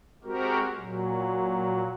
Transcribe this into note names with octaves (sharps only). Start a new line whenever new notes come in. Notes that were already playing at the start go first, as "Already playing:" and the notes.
G#3 C4 F#4 G4 A#4
A#2 F#3